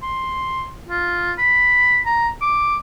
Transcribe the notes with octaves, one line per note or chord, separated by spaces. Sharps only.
C6
F4
B5
A#5
D6